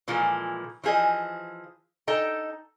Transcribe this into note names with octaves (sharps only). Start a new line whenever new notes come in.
A#2 E3 F3 G#3 A3
E3 F3 G#4 C5 D#5
D#4 A4 D#5 G5